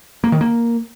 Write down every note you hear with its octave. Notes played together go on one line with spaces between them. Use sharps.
A#3
D#3
A#3